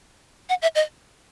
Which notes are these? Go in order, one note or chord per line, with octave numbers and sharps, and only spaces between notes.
F#5
E5
D#5